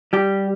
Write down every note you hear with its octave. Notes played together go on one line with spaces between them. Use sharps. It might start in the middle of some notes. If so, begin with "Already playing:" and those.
G3 G4